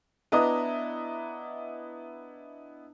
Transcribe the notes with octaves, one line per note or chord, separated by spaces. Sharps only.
B3 D4 E4 D#5 A#5 D#6